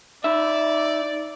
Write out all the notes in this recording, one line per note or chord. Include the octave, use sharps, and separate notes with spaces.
D#4 D5 E5